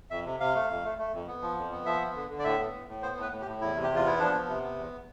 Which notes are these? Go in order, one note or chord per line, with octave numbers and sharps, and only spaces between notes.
F2 E5
C3
C3 F5
A3
F2
A3
A3
F2
B3
F3
F2
B3
F3 E5
B3
D3
D3
D5
A2 E5
B3
A2
A2
B3 C5
A2 B4
A2
G4
A2
E2 E4
C3
G4
E2
F4
B3 E4
F3 D4
B3
C3
B3
E2